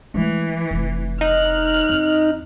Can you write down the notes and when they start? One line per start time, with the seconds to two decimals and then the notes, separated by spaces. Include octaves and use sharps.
0.14 E3 G#3 A3
0.71 F1 A3
1.21 D#4 F6 F#6
1.89 F2